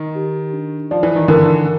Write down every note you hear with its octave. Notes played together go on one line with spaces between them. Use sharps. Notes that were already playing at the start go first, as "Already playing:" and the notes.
Already playing: D#3
G4
D4
F3 D5
E3
D#3
D3 E3 A#4